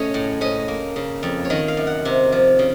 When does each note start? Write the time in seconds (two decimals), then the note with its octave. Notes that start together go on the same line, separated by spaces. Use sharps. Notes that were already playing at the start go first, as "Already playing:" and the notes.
Already playing: C#3 A3 C#4 C#5 D#5
0.14 A2
0.41 C#4 D#5
0.68 A#3
0.96 C#3
1.23 F2
1.45 C#5
1.50 D#3 D#5
1.68 F5
1.77 F#2
1.87 F#5
2.05 C3
2.32 F3
2.59 C#3